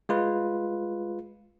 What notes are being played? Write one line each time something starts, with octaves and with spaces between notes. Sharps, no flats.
G#3 F4 B4